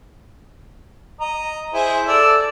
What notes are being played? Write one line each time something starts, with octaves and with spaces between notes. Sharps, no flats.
D#5 A#5
E4 G#4 C5
A4 D5 E6